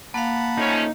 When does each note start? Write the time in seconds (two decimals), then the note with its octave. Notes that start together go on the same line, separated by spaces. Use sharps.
0.14 A#3 F5 F#5 A5 B5
0.58 F3 A3 C#4 D#4